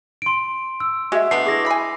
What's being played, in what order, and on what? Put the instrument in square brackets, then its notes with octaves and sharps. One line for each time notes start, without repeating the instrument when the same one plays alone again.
[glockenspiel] C6 D7
E6
[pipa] G#3 [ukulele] F#4 E5
[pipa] A3 B3 D4 [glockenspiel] C7
[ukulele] E4 G#4 [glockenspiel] D6 A#6
[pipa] G#5 B5